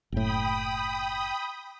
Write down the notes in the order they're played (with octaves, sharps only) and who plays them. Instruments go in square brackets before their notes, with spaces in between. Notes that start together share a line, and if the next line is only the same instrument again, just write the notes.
[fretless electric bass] F#1 A2 [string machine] G5 B5 D#6